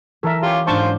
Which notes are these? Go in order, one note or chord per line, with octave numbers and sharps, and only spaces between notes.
E3 A4 A#4 E5
C#4 F4 G4
G#2 D#3 C#4 D4 F4 C5 A5 C#6